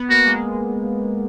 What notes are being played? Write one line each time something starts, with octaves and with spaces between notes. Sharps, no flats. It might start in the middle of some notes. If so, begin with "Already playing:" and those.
Already playing: B3
A#3 F#4
G#3